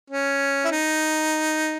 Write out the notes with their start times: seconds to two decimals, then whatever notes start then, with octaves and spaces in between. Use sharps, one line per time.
0.10 C#4
0.65 E4
0.71 D#4